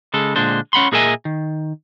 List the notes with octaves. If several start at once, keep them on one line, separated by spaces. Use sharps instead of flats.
C#3 G#3 A4
A#2 D3 G#3 D4 C5
C#4 F#5 B5 C6
A#2 G#4 A#4 D#5 E5 G#5
D#3